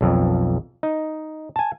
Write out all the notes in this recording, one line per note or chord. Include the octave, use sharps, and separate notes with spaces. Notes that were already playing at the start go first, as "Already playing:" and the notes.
B1 F2
D#4
G#5 A5